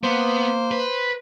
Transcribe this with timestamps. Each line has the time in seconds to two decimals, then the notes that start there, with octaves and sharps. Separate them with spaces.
0.03 A#3 B3 C5
0.71 B4